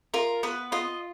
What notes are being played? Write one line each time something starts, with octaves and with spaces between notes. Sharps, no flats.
F4 A#4
B3 B4
F4 D#5